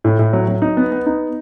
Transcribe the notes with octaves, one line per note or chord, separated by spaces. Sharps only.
A2
A2
F#3
F#3
D#4
B3
B3
D#4